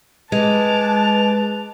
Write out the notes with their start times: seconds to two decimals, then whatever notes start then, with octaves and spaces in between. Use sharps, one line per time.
0.32 G#3 B4 A5 D6 F7